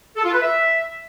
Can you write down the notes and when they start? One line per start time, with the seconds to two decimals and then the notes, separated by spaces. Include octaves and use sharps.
0.16 A4
0.24 F4
0.33 B4
0.41 E5